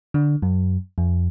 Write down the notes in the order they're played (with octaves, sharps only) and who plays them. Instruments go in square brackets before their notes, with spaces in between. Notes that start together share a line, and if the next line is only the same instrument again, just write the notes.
[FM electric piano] D3
F#2
F2